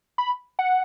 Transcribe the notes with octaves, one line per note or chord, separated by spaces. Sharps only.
B5
F#5